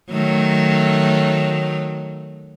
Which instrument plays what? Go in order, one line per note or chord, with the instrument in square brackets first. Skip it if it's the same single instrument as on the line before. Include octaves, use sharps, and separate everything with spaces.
[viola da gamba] D#3 F#3 A3